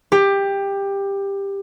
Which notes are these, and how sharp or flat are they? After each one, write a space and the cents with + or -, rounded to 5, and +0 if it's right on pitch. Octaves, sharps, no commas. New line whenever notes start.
G4 +15